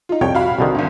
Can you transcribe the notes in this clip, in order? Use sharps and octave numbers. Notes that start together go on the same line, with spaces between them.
D#4 F4
C2 F2 C#5 G5
F#4 F5 B5
C2 D3 D#3
G#1 D2